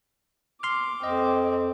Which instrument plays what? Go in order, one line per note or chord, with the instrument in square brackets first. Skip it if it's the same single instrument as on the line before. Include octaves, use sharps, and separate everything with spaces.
[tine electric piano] C6 F6 [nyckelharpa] D6
[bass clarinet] F2 [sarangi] C4 [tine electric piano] D#5